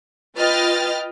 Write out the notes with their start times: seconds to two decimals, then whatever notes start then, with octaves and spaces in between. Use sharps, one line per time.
0.36 F4 B4 D#5 G5 F6 A6